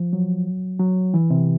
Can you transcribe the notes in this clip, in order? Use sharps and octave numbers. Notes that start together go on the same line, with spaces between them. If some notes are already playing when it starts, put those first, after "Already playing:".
Already playing: F3
F#3
F#3
E3
C3